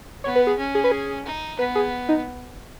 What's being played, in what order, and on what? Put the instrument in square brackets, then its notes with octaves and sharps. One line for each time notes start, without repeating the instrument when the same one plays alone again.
[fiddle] B3 [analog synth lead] C#5
[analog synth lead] B4
G#4
[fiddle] C#4
[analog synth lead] G#4
B4
G#4
[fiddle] D#4
[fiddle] B3 [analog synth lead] B4
[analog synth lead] G#4
D#4